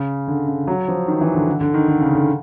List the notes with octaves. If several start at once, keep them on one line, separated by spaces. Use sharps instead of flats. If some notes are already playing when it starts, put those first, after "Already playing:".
Already playing: C#3
D3
C#3
F#3
F3
D#3
E3
D3
D3
D3
D#3
D3
C#3
D3